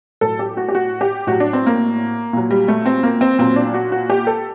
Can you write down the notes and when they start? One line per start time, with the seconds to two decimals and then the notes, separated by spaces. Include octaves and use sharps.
0.21 A2 F#3 A4
0.39 G4
0.57 F#4
0.69 G4
0.75 F#4
1.01 G4
1.27 A2 F#3 F#4
1.40 D4
1.53 C4
1.67 A#3
2.33 A#2 F#3
2.51 G3
2.68 A3
2.86 C4
3.03 A#3
3.21 C4
3.39 A#2 F#3 C4
3.56 D4
3.74 F#4
3.92 F#4
4.10 G4
4.27 A4